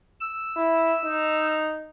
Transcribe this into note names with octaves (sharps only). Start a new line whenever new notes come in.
E6
E4
D#4